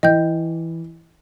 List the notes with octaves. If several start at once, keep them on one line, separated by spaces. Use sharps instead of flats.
E3 D#5 G5 G6